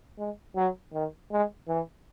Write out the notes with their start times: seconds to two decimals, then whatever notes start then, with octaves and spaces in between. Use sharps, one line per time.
0.18 G#3
0.56 F#3
0.93 D#3
1.32 G#3
1.68 E3